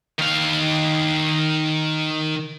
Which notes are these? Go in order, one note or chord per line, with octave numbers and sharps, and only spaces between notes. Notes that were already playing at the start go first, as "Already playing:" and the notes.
D#3 F5